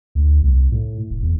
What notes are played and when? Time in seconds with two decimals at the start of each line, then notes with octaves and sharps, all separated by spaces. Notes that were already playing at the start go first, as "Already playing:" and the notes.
0.15 D2
0.42 C2
0.72 A2
1.10 F1
1.23 E2